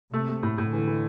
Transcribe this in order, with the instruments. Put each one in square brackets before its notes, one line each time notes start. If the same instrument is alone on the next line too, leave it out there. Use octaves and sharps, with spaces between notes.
[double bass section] C3 [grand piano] A3
[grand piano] A3
A2
A2
[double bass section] D3 [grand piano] E3
[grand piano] E3